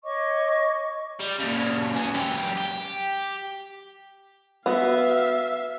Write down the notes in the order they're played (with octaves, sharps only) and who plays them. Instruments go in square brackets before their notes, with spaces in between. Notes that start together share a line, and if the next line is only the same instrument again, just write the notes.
[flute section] C#5 D#5 C#6 D6
[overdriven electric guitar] G3
A#2 C#3
B3 G#4
F#2 G4
G4
[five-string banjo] B3 F#4 [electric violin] E5 F5